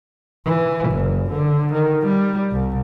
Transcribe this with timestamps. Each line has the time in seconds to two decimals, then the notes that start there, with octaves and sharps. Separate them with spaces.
0.46 E3
0.90 F#1
1.31 D3
1.74 D#3
2.07 G3
2.51 C2